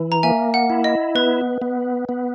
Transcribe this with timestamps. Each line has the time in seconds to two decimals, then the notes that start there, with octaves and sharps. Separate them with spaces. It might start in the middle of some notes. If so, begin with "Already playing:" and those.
Already playing: E3
0.12 A#5
0.23 A#3 E5 G#5
0.54 F#5
0.70 E4
0.84 D#5
1.15 B3 B4
1.62 B3
2.09 B3